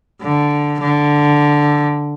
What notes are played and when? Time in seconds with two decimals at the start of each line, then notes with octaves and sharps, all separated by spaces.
0.22 D3
0.80 D3